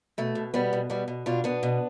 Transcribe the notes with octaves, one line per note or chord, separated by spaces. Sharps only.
B2 A3
B2
B2 G3 B3
B2
B2 G3 B3
B2
B2 D4 F4
B2 B3 D4
B2